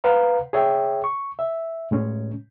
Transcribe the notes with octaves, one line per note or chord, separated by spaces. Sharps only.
B4 C5 F5 F#5 A#5
G#4 C#5 E5 G5
C#6
E5
A2 G#3 C#4